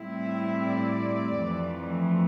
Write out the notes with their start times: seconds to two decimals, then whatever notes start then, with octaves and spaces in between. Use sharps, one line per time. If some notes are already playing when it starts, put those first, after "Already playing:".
Already playing: A2 G3 C4 E4
0.24 E5
0.61 D5
1.35 F2 E3 A3